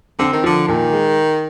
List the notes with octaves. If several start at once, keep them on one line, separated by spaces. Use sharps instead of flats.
D3 C4
D#3
D3 F3
A#2 D#3
G#3